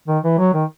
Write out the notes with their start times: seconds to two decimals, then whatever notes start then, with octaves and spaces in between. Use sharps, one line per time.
0.08 D#3
0.24 E3
0.38 F#3
0.54 D#3